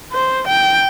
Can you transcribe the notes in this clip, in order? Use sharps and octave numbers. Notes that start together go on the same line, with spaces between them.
C5
G5